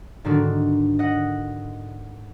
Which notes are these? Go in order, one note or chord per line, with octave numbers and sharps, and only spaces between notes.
G#2 D3 D#3 D4 F#4
D#5 F#5